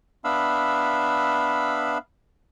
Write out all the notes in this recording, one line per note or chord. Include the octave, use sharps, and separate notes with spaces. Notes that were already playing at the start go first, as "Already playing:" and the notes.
B3 D4 E5 F5 B5 E6